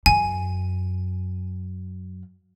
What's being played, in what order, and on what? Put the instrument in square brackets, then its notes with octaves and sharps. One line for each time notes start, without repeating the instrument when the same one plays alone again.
[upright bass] F#2 [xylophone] G#5